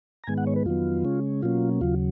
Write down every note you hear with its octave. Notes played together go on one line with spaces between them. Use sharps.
A#5
G#2 D#3 G#3 B3 G#5
F#5
C#5
B4
F2 D#3 F#3 B3 F4
C#3 G#3 C#4
B2 F#3 A#3 C#4 F4
D#2 C#3 F#3 F4